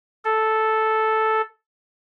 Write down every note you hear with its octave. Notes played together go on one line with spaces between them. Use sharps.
A4